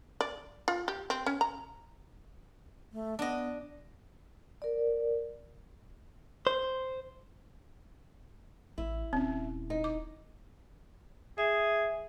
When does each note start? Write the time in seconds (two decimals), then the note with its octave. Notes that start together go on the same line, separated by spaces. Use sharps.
0.21 D5
0.68 F4
0.88 G4
1.10 C4
1.26 C#4
1.41 A#5
2.93 A3
3.19 B3 D4 D#5
4.62 A#4 D5
6.47 C5
8.78 A1 E4
9.13 D#1 C4 C#4
9.70 D#4
9.84 D6
11.38 G#4 E5